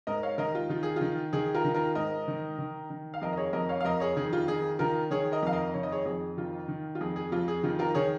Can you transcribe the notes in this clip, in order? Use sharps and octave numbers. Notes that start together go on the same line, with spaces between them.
G#2 A#4 D#5
C#5 F5
D#3 A#4 D#5
F4
D#3 F4
G#4
D#3 F4
D#3 G#4
F4 A#4
D#3
F4 A#4
G#2 A#4 D#5
D#3
D#3
D#3
F5
F2 A#4 D#5
D#5
G#4 C#5
F2 A#4 D#5
C#5 F5
F5
F2 A#4 D#5
G#4 C#5
D#3 G#4
F4
D#3 G#4
D#3 F4 A#4
D#3 G#4 C#5
A#4 D#5
F2 F5
A#4 D#5
D#3 C#5
D#5
G#4 C#5
F2 G#4
D#3 F4
D#3
F4
F2 G#4
G#4
F2 F4
G#4
D#3 F4
F4 A#4
D#3 G#4 C#5